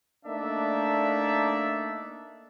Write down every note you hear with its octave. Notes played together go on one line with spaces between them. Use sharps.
A3 A#3 D4 D#4 D5 E5